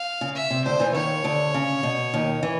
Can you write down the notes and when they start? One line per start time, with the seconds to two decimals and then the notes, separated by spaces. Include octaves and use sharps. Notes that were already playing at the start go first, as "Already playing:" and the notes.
Already playing: F5
0.21 C#3
0.36 E5
0.50 C3
0.65 D2 D3 C5
0.79 E2 E3
0.94 D#2 D#3 C#5
1.24 D2 D3
1.54 C#3
1.83 B2
2.14 D#2 D#3
2.43 E3